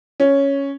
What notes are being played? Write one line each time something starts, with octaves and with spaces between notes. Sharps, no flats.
C#4